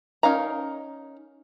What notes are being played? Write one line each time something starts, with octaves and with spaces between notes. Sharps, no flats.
C#4 D#4 A#4 F5 A#5